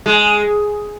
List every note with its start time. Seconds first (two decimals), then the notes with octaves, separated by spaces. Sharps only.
0.06 G#3